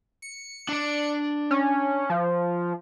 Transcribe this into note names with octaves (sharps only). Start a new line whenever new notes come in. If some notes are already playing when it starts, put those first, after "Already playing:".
C#7
D4 D5
C#4
F3